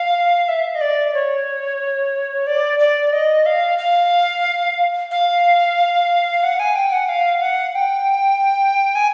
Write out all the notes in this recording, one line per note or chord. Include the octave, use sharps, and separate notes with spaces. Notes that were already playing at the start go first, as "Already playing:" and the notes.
Already playing: F5
E5
D#5
D5
C#5
D5
D5
D#5
F5
F5
F5
F#5
G#5
G5
F#5
F5
F#5
G5
G#5